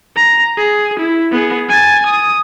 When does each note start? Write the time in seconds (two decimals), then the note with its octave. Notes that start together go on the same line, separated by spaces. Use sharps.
0.16 A#5
0.57 G#4
0.99 E4
1.32 B3 G#4
1.69 G#5 A6
2.07 D#6